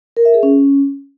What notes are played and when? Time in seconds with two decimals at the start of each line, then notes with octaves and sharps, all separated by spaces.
0.17 A#4
0.25 E5
0.34 G#4
0.43 C#4